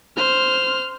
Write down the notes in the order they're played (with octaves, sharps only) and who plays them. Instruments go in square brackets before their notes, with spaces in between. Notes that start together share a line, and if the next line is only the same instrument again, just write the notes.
[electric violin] C5 F6